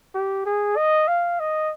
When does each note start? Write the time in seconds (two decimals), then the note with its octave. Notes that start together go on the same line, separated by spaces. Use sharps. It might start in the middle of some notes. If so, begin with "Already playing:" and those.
0.15 G4
0.46 G#4
0.77 D#5
1.08 F5
1.40 D#5